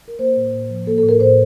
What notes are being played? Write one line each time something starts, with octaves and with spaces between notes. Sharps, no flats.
A#4
A#3 C5
A2
A2
F3
A#3 A4
A4
A2
A#4
A2 C5